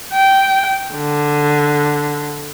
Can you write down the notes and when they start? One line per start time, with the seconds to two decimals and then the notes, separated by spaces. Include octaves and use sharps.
0.13 G5
0.94 D3